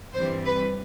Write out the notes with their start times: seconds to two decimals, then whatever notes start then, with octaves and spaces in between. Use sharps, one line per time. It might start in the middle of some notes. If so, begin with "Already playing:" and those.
0.13 G2 E3 G3 C4 C5
0.45 B4